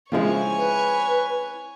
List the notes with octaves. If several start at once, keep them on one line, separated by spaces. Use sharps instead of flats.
C#3 F3 G#3 C4 E4 C#5 G#5
B4